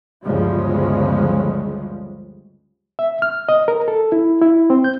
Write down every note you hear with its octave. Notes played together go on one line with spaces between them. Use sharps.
G1 D2 C#3 F3 G3 G#3
E5
F6
D#5
A#4
A4
E4
E4
C4
G6